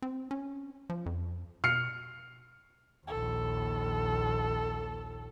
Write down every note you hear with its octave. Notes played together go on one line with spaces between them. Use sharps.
C4
C#4
F3
F2
B2 F6 C7 C#7
A#1 D#2 A4